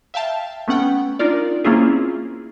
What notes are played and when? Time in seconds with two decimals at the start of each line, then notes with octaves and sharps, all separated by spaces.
0.14 E5 F5 G5 A5
0.68 A3 B3 C#4 F#5 G5
1.19 D4 D#4 F4 A#4 D5
1.64 A#3 C4 C#4 E4 F4 G#4